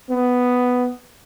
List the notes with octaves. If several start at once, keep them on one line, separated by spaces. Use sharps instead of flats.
B3